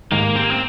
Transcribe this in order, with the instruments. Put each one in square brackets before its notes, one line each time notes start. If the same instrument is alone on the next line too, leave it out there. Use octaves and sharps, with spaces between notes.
[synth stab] G#2 D#3 G#3 D#4 G4 [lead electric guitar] A#3
[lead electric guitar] C4
A#3
C4